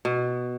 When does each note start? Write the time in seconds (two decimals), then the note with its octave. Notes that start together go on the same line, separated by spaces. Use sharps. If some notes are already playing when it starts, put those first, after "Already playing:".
0.05 B2